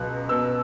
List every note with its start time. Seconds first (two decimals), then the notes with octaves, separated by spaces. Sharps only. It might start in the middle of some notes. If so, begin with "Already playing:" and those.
Already playing: C#2 B2 F#3 B3 F#6
0.29 B2 B3 E6